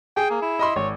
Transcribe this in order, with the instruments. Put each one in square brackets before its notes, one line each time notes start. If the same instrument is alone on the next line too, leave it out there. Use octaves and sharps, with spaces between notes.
[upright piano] G#4 [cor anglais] G5
[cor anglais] A#3
E4
[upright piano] D#5 B5 C6
[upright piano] G#1 [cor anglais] C#5